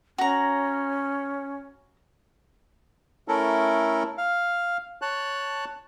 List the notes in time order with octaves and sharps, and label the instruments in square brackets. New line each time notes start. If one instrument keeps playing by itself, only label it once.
[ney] C#4 [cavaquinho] F#4 A#5
[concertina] A3 C#4 E4 A4 A#4
F5
C#5 A5 F#6